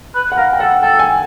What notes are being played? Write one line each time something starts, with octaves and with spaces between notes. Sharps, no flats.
B4
F#5
A#4 F5
G5
A4 F#5
A4 G5
G#5